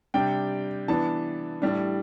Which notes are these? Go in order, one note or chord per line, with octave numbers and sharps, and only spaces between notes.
C3 G3 D4 G5
E3 B3 D4 A5
A2 G3 D4